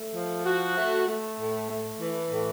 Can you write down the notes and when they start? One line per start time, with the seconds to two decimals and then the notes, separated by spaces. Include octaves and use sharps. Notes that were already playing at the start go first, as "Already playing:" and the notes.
Already playing: A3
0.13 F3
0.45 F#4
0.76 A3
1.07 A3
1.39 A2
1.69 A3
2.00 E3
2.31 A2